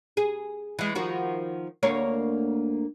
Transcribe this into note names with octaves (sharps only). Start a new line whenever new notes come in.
G#4
E3 G#3
D#3 F3 F#4
D2 A#3 C#5